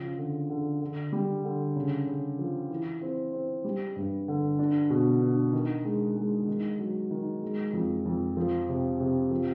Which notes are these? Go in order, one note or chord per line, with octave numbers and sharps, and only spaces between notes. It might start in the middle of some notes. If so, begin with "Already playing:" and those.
Already playing: C#3 F3
D3
D3
D3
G3
D3
C#3
C#3
F3
E3
C4
C4
G3
G2
D3
D4
B2
D4
D#3
G#3
G#3
D#3
F#3
D#3
G#3
F2
F2
F3
C3
C3
F3